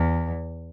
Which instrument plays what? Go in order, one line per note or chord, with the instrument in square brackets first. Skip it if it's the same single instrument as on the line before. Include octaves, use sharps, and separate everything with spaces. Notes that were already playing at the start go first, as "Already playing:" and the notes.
Already playing: [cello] E2